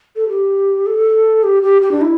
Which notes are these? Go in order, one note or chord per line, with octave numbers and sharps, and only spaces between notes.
A4
G4
A4
G4
G4
G4
D4
E4